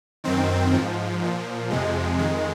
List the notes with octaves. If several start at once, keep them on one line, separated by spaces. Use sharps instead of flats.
F#2 D#3 C4
G#2 F3
A#2 F3
F2 C3 F3 G#3
F2 D#3 G#3